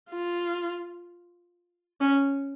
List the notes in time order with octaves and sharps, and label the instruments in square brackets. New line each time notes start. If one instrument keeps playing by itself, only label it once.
[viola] F4
C#4